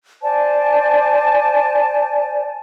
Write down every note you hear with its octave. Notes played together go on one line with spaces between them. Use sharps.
C5 D5 G#5 A5